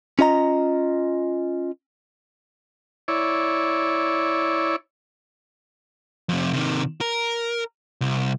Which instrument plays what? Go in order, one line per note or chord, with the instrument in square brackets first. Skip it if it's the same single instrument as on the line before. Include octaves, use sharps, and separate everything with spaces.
[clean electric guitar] C#4 F4 D#5 A#5
[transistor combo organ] E4 C#5 D5
[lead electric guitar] F2 C3
C3 D#3
A#4
C2